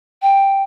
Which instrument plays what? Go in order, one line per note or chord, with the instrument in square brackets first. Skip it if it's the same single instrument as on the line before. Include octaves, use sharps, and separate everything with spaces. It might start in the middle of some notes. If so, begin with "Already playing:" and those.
[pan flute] G5